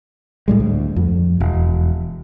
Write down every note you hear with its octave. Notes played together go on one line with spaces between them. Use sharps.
A2 G3 G#3
D2
F2
E1